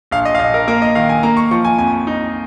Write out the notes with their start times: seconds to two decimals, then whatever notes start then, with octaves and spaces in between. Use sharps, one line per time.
0.11 A#1 F5
0.25 D#5
0.35 F5
0.39 A#1 D#5
0.54 A#4
0.68 A#3 A#4
0.82 D#5
0.95 D#3 F5
1.09 G#5
1.23 A#3 A#5
1.37 C#6
1.51 F3 C#6
1.65 G#5
1.78 F2 G#5
2.07 D#4